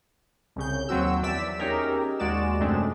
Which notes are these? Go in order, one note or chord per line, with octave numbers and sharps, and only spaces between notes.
C2 C#3 G6
D#2 F#3 C4 F#4 E6
E2 D5 E5 E6 B6
C#4 D#4 G4 G#4 A#4
D#2 G#3 F#4 D5 E7
F#2 C3 G#3 A3 D4